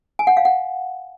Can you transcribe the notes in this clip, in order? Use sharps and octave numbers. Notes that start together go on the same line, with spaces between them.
G#5
F#5
F5
F#5